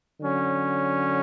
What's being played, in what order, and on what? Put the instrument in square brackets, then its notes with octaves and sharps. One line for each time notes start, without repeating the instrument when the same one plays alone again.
[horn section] D3 F#3 C#4